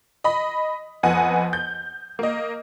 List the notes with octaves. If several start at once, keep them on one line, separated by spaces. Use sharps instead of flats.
D#5 B5
F2 B3 D#5 F#5 G#5
G6
A#3 D#5